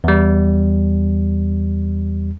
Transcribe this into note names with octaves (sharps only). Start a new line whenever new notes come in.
E2 G3